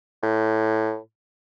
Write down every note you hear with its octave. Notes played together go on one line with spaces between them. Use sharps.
A2